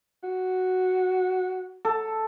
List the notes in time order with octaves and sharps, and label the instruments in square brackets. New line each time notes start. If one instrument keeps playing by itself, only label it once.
[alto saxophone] F#4
[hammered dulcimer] A4